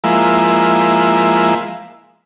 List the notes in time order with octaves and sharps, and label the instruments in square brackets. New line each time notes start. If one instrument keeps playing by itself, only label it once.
[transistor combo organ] F3 G#3 A#3 E4